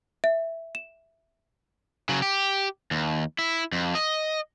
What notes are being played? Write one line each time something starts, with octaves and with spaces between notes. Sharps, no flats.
E5
E7
C#3 F#3
G4
D#2
E4
F2
D#5